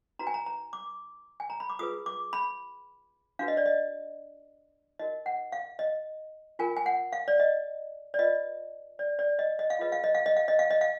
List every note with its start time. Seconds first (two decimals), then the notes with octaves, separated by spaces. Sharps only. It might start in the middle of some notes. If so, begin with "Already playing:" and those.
0.19 D#4 F#4 B4 A#5
0.27 G#5
0.34 A#5
0.46 A#5
0.73 D6
1.40 G#5
1.50 A#5
1.60 B5
1.70 D6
1.79 F4 G#4 B4 D#6
2.06 D6
2.33 B5
3.39 D4 F#4 B4 F5
3.48 D#5
3.57 D5
3.66 D#5
4.99 D#4 F#4 A#4 D#5
5.26 F#5
5.52 F5
5.79 D#5
6.59 F4 A#4 G#5
6.77 G#5
6.86 F#5
7.13 F5
7.28 D5
7.40 D#5
8.14 D5
8.19 F4 B4 D#5
8.99 D5
9.19 D5
9.39 D#5
9.59 D#5
9.70 F5
9.79 F4 G#4 B4 D#5
9.92 F5
10.04 D#5
10.15 F5
10.26 D#5
10.36 F5
10.48 D#5
10.59 F5
10.71 D#5
10.81 F5